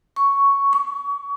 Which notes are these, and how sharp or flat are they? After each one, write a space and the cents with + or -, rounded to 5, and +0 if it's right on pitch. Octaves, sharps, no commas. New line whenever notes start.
C#6 +5
C#6 +35